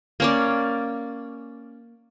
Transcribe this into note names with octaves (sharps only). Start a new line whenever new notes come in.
A#3 C#4 D5